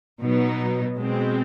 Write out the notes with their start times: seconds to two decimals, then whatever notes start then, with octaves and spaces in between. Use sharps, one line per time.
0.21 B2 F#3 B3 D#4
0.97 B2 G#3 C4